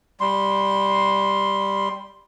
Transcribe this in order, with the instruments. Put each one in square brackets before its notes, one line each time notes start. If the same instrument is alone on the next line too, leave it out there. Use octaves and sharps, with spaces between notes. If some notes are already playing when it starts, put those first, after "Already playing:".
[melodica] G3 C6